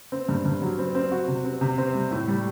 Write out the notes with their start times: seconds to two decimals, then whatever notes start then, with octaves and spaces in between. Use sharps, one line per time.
0.12 C4
0.29 G2
0.45 G2
0.62 F#3
0.79 C4
0.95 C4
1.11 F#4
1.28 C3
1.45 C4
1.61 C3
1.78 C4
1.95 G3
2.11 A2
2.28 G3